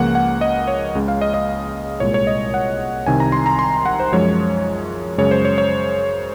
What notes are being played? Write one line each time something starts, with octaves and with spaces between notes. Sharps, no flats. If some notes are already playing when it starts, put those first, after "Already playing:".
Already playing: C#2 C#3 F3 A#3 F#5
F#5
D#5
C#5
C#2 C#3 G#3
F5
D#5
D#5
C2 A#2 G#3 C#5
C#5
D#5
F#5
C2 C3 D#3 G#5
A#5
C6
A#5
C6
F#5
C5
F#2 F3 G#3 C#5
F#2 C#3 G#3 C#5
C5
C#5
C#5